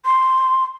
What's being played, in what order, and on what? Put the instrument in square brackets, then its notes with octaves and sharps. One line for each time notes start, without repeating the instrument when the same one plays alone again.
[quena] C6